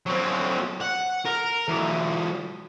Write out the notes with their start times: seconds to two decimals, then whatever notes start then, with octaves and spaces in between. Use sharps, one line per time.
0.06 F#3 C4
0.81 F#5
1.25 A#4
1.68 E3 F#3